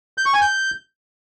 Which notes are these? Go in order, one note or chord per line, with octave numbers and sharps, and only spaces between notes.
G6
C#6
G#5
G6